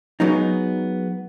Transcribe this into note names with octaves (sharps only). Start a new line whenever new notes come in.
F#3 G#3 B3 D#4